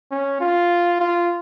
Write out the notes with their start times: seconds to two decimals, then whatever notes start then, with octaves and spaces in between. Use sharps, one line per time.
0.11 C#4
0.41 F4
1.00 F4